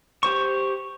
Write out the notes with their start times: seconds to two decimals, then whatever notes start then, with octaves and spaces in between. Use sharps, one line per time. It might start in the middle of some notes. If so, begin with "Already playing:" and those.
0.23 G4 C5 C#6